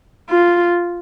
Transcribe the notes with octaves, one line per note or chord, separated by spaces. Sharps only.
F4